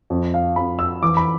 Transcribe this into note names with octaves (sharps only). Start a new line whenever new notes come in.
F2
F5
F2 B5
E6
E3 D6
B5